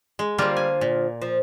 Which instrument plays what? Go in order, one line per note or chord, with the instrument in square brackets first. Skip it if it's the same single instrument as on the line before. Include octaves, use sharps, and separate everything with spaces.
[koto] G#3
[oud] D3 F3 [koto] G3 A#3 F4
[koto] G#5
A#2
[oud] F3